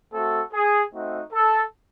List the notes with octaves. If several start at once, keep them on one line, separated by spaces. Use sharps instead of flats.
A3 C4 F#4 A4
G#4
A3 C4 D#4 F#4
A4